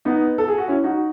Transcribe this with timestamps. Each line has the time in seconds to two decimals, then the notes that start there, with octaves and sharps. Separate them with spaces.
0.05 B3 D#4
0.38 A4
0.48 G#4
0.58 F#4
0.68 C#4 E4
0.84 D#4 F#4